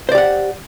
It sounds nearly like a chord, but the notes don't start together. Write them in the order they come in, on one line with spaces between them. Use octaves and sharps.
C5 D5 G4 F#5